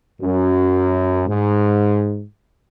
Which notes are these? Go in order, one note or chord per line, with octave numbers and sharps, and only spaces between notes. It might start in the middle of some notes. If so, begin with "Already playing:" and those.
F#2
G#2